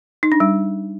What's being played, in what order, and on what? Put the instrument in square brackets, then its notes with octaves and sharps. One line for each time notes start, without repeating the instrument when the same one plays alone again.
[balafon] D#4
D4
G3